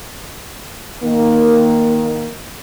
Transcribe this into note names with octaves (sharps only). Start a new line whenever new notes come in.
D#3 A#3